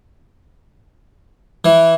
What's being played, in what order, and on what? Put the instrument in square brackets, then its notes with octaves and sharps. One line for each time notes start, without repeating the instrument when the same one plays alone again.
[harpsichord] E3